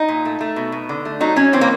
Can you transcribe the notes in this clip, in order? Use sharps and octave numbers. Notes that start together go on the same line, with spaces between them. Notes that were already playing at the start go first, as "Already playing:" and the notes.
Already playing: D#4
A#2
A3
A3
B2
B2
D3
A3
F#3 D#4
F#3 C#4
E3 C4
A#3